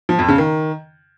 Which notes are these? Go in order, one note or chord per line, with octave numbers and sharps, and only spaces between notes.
F3
F2
C#3
D#3